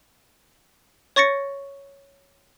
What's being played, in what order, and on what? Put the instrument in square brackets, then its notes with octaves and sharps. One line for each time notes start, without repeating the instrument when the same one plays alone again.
[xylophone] C#5 C#6 A6 A#6 C#7